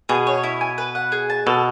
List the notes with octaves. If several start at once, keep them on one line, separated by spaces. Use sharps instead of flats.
B2 G#4
C#5
E4
G#5
B4
F#5
G#4
A5
B2 A4